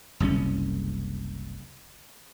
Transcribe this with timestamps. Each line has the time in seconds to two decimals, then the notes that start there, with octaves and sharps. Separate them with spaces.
0.20 F#1 C2 C#3 C#4